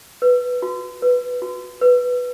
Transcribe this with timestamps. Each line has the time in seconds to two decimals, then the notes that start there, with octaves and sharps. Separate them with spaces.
0.22 B4
0.62 F#4
1.02 B4
1.42 F#4
1.81 B4